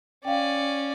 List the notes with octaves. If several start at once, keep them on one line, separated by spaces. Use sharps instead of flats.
C#4 D5 F5 G5